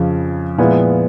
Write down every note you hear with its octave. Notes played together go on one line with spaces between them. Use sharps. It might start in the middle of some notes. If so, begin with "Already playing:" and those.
Already playing: F2 C#3 F3
A#2 F3 G#3 B3 E4